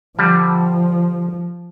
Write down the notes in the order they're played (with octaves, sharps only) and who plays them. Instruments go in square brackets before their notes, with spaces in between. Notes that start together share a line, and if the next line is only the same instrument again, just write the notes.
[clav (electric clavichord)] D3 G3 [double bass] F3